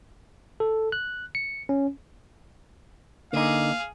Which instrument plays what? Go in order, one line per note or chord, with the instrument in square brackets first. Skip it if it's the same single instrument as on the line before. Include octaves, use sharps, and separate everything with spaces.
[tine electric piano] A4
F#6
C#7
C#4
[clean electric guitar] D3 D#4 [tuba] A#3 [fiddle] G#4 [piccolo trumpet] F5